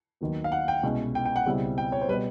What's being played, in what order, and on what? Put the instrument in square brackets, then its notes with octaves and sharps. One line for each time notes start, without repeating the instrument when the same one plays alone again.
[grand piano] D#2 D#3 F#3 B3
[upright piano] F5
F#5
G5
[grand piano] C2 B2 G#3 C#4 E4
[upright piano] G5
G5
F#5
[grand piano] C#2 B2 G3 C4 E4
[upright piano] G5
C#5
C5
[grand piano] B2 G3 [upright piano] B4